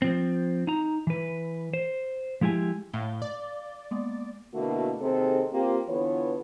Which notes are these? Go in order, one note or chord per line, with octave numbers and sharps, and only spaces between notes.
F3 C4
D#4 A#5
E3 B4
C5
F3 G#3 E4 G4 G#5
A2 F5 G7
D5
G#3 A#3 B3
B2 D3 A3 A#3 E4 F#4
D#2 C3 C4 D#4 G#4 A4
A#3 C4 F4 G4
D3 E3 B3 F4 A4 C#5